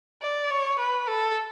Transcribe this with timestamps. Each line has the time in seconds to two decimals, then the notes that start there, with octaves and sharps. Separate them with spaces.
0.22 D5
0.51 C#5
0.79 B4
1.08 A4